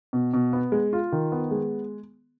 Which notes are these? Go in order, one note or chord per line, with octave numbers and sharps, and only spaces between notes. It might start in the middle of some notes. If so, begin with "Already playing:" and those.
B2
B2
B3
G#3
F4
D#3
B3
G#3